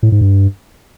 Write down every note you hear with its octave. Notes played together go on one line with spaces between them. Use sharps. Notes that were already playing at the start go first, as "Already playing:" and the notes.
A2
G#2
G2